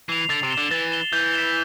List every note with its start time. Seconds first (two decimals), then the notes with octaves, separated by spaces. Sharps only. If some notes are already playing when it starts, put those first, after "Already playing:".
0.08 E3 C7 F7
0.29 D3 A6
0.43 C3
0.50 E7 G7
0.57 D3
0.71 E3 A6
0.92 E7 G7
1.13 E3 G6
1.34 B6 E7 G7